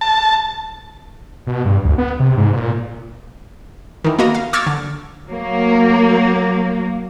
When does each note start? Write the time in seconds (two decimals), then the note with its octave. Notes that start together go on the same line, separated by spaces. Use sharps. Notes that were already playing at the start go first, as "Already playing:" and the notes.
0.01 A5
1.47 B2
1.65 G2
1.85 D2
1.98 B3
2.20 C3
2.37 G#2
2.53 A#2
4.04 D#3 E3
4.19 A#3 B3 F#4 D#5 A#5
4.35 F5
4.53 C#6 D6 E6 F6 G#6 A6
4.67 D3
5.28 F#3 A#3